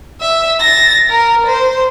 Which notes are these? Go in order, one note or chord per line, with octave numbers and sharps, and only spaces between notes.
E5
A6 A#6
A#4
C5